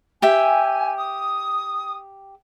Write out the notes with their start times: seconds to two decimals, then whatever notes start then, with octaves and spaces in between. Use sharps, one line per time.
0.22 G4 E5 G5 G#5
0.97 D#6